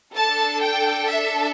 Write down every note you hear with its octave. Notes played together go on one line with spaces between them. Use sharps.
D4 A4 A5
G5
E5